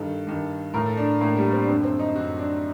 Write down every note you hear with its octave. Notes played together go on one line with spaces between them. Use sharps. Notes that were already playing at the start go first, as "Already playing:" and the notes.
Already playing: G2 D#3 A4
G2 D#3
A2 A#4
A4
D4
A2 A#3
G3
C4
D4
F#2 D3 C4
C4
D#4
F#2 D3 F#4
D4